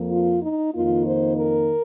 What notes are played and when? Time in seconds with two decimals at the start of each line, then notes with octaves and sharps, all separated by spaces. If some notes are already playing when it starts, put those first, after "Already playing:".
Already playing: F2 F3 A#3
0.10 F4
0.42 D#4
0.74 F2 D#3 A#3 D#4 F4
1.05 C5
1.37 A#4